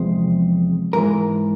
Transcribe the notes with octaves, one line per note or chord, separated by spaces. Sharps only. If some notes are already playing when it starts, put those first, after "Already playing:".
Already playing: E2 C3 F3 G#3 C5
G#2 E3 G#3 A#4